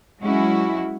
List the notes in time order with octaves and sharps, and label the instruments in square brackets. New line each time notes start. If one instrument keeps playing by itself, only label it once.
[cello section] F#3 G#3 C#4 E4 F#4